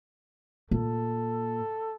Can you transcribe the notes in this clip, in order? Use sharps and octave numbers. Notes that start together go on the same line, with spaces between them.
A#2 A4